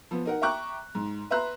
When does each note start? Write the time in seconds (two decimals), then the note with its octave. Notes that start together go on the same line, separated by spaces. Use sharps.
0.11 F3 B3
0.26 D#4 A#4 F#5
0.42 E5 G5 A#5 C#6 D6 F#6
0.95 G#2
1.31 B4 E5 A#5 C6 F#6